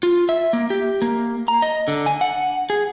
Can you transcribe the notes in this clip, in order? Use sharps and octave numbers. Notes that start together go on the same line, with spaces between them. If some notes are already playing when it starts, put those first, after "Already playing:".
F4
E5
A#3
G4
A#3
A#5
D#5
D3
G#5
F#5
G#4